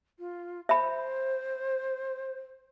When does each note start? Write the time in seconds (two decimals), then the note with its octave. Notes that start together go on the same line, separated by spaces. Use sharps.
0.19 F4
0.69 C5 E5 B5